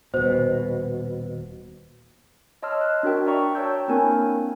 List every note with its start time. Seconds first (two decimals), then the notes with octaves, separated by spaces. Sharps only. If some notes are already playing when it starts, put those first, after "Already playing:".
0.14 D#1 B2 C5
2.62 C#5 D#5 A5 C6 E6 F6
2.81 F#6
3.03 D4 F#4 A#4 G5
3.26 D5 E5 A#5 C#6
3.55 C#5 G5 A5 E6 G6
3.88 A#3 C4 D4 E4 A#4 G#5